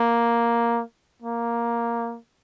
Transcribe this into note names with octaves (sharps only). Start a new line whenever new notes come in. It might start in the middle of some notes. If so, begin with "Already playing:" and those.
Already playing: A#3
A#3